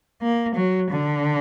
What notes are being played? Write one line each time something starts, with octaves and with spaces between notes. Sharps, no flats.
A#3
F#3
D3